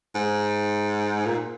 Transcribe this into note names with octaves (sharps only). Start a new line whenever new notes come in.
G#2
A#2